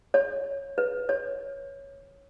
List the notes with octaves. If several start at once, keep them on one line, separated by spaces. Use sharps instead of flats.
C#5
B4
C#5